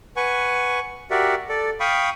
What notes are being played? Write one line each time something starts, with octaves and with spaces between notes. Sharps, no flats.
B4 F#5 G#5 C#6
F#4 G4 A#4 D5 E5 F#5
A4 D5
F5 G5 B5 C#6 D#6